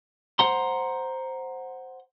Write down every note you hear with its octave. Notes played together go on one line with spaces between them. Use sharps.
C5 F#5 A#5 C6